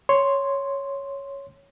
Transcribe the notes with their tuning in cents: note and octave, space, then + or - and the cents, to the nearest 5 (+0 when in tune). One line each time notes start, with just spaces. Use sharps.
C#5 +0 C6 +0